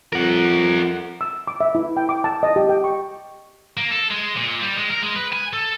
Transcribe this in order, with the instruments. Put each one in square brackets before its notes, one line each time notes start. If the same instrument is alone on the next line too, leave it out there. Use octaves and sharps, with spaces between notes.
[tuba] F2 [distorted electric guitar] A#4 F#5
[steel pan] E6
D6
E5
E4
G5
D6
A5
D#5
G4
G5
C#6
[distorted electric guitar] A#3
A4
G#3
A#2
G3
G#3
A#4
G#3
B4
G#5
A4